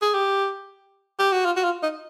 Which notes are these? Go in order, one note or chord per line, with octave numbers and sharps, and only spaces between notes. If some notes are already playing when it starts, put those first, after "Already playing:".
G#4
G4
G4
F#4
F4
F#4
F4
D#4